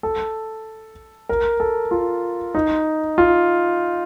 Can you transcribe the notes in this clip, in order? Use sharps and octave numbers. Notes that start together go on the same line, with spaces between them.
A4
A#4
A4
F4
D#4
F4